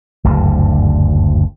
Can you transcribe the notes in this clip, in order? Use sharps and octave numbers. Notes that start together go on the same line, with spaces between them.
F#1 D2 G2 D3